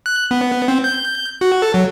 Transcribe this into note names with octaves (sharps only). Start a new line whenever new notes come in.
F#6
B3
C4
G6
F#4
A4
F#3